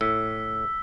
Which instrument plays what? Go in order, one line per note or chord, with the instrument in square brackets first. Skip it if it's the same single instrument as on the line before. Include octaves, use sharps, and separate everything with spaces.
[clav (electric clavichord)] A2 [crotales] E6 B6